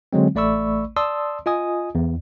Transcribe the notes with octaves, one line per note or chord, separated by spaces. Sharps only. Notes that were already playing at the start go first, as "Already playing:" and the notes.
D3 F#3 G#3 C4
A1 A3 D5 B5 C#6 E6
D5 A5 C6 D#6 E6
F4 D#5 G#5 D#6
E2